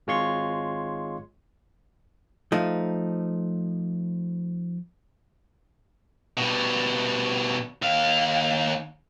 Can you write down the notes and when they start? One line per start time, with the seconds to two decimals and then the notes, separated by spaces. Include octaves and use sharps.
0.07 G#1 G#3 F4 C#5 C6 C#6
2.52 F3 A3 D#4
6.37 B2 G3
7.82 D#2 F5